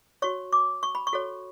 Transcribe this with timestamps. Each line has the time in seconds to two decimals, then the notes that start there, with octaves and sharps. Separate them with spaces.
0.22 F#4 C#5 C#6
0.53 D6
0.83 C#6
0.95 B5
1.07 C#6
1.13 F#4 A4 C#5